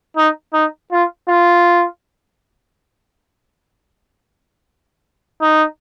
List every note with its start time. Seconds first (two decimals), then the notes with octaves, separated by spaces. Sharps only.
0.17 D#4
0.54 D#4
0.92 F4
1.29 F4
5.41 D#4